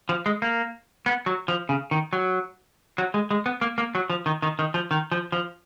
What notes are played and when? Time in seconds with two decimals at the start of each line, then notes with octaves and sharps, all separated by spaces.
0.09 F3
0.26 G#3
0.42 A#3
1.06 B3
1.26 F#3
1.48 F3
1.69 C#3
1.91 D#3
2.13 F#3
2.98 F#3
3.14 G#3
3.31 G#3
3.46 B3
3.61 A#3
3.78 A#3
3.95 F#3
4.10 F3
4.26 D#3
4.42 D#3
4.59 D#3
4.74 F3
4.91 D#3
5.12 F3
5.32 F3